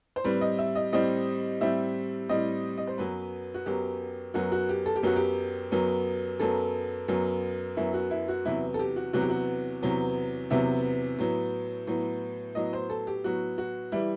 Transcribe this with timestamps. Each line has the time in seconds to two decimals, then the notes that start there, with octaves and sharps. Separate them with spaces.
0.16 C5
0.24 A2 G3 C4 B4
0.41 D#5
0.58 E5
0.75 D#5
0.92 A2 G3 C4 D#5
1.60 A2 G3 C4 E5
2.29 A2 G3 C4 D#5
2.78 D#5
2.87 C5
2.98 F#2 F#3 B3 B4
3.54 F#4
3.66 F#2 F#3 B3 G4
4.34 F#2 F#3 B3 F#4
4.52 F#4
4.69 G4
4.86 A4
4.96 G4
5.03 F#2 F#3 B3 F#4
5.16 G4
5.71 F#2 F#3 B3
6.40 F#2 F#3 B3 A4
7.08 F#2 F#3 B3
7.77 F#2 F#3 B3 E4
7.94 F#4
8.11 E4
8.28 F#4
8.45 E2 C3 F#3 B3 E4
8.74 A4
8.79 G4
8.96 F#4
9.13 E2 C3 F#3 B3 F#4
9.21 G4
9.30 F#4
9.82 E2 C3 F#3 B3
10.50 E2 C3 F#3 B3 E5
11.18 A2 F#3 B3
11.87 A2 F#3 B3
12.55 A2 F#3 B3 D#5
12.73 C5
12.90 A4
13.07 G4
13.24 A2 F#3 B3 F#4
13.58 F#4
13.92 E3 G3 E4